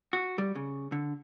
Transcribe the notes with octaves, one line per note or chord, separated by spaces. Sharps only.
F#4
G3
C#3
D3